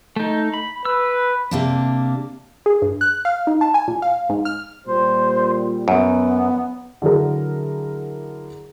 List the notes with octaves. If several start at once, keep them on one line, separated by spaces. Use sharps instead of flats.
A3 D#4
B5
B4 E6
C3 A#3 D4
G#4
G2
F#6
F5
D#4
A5
G#5
A#2
F5
G#2
F6
A#2 G3 C5
F#2 B3
D3 F#3 E4 G#4 A#4